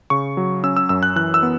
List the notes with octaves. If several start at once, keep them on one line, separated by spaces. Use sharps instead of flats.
C#3 C#6
F#3
C#4 E6
E6
F#2 E6
F#6
E3 F#6
E6
B3